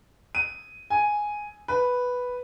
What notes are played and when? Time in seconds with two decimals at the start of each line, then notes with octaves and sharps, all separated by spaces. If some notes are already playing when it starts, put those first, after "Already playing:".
0.35 D#7
0.90 G#5
1.68 B4